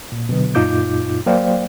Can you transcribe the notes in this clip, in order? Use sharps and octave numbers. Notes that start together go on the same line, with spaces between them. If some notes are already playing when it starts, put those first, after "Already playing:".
A#2
B2 D3 F#3 B3
F#2 A#2 D#4 F4 D6 G6
F#3 A#3 C5 D5 F5 G5